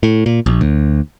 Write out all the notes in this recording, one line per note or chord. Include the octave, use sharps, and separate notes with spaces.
A2
A#2
A#1
D2